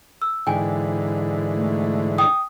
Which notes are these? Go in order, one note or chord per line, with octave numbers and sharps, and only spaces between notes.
E6
G#2 D3 E3 G5 G#5
A3
G5 D#6